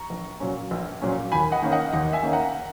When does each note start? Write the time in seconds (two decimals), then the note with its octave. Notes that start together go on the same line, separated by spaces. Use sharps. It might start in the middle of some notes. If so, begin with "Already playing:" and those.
Already playing: A#5 C#6
0.10 A#1
0.40 A#2 F#3 C#4
0.71 A#1
1.02 A#2 F#3 C#4
1.32 D#2 G#5 B5
1.52 D#5 F#5
1.62 D#3 A#3 C#4
1.72 D#5 F#5
1.93 D#2 D#5 F#5
2.13 E5 G#5
2.23 D#3 A#3 C#4
2.33 F#5 A#5